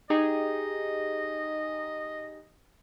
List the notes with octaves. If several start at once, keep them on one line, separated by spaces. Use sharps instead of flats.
D#4 G4 G#4 D#5